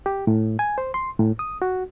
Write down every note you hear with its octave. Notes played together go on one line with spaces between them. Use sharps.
G4
A2
G#5
C5
C6
A2
D#6
F#4